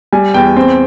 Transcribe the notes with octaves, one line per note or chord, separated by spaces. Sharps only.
G3 G#5
E2 G5
C4